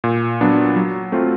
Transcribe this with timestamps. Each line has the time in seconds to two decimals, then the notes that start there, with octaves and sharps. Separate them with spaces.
0.04 A#2
0.41 F#3 B3 D4
0.76 F#3
1.12 A3 C4 F4